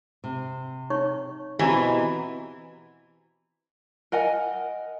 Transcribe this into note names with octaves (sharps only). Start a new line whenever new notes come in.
C3
D#4 C#5 C#6
B2 E3 C4 G4 D#5 G#5 A#5
A#4 D#5 F#5 G#5